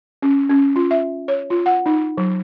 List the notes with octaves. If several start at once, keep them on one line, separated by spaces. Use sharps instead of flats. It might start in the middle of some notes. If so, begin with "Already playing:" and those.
C#4
C#4
F4
E5
C#5
F4
F#5
D#4
F#3